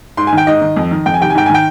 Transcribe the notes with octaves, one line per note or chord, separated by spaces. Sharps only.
G#2 C6
G#5
D#3
G5
G#2 D#5
D#3
F2
D#3
F2 G5
G#5
C3 D#3 G5
G#5
G#2 G5
G#5
D#3 G5